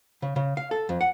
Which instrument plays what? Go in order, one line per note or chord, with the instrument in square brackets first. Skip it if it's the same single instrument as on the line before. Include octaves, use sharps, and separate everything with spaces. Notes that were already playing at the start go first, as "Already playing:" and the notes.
[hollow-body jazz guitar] C#3
C#3
F5
A4
F2
F#5